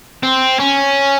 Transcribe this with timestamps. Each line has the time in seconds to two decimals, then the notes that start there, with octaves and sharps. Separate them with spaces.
0.23 C4
0.59 C#4